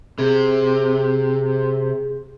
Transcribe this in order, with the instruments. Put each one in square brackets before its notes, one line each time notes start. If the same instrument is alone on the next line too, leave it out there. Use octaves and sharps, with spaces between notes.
[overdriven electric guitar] C3 [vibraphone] G#4